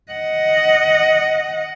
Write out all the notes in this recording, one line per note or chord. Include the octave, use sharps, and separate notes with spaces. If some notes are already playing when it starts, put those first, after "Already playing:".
D#5 F#5